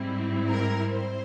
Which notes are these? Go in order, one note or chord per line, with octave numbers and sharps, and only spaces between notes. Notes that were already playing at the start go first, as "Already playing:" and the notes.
Already playing: G#2 G3 C4 E4
A#4
C5